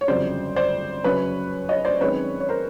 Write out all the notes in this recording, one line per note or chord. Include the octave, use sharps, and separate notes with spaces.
C#5
G1 F2 C#3 F#3 C5 D5
C5 D5
F#2 C#3 F#3 B4 C#5
C#5 D#5
C5 D5
F#2 D#3 G#3 C4 B4 C#5
C#5
A#4 C5